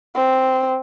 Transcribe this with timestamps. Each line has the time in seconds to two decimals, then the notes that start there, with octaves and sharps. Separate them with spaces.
0.16 C4